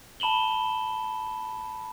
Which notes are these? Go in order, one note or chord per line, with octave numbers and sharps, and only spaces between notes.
A5 B5 E7 F#7 G7